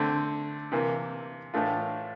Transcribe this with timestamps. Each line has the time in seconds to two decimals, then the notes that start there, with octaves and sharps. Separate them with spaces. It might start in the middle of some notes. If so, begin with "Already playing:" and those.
Already playing: D3 A3 C4
0.72 C3 E3 A#3
1.54 A2 E3 A3 D4 F4